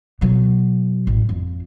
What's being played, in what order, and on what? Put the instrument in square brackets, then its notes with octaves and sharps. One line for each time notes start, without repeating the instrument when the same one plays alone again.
[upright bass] B2 F#3
A1
F2